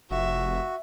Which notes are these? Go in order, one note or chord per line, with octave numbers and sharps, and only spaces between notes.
F1 F#4 E5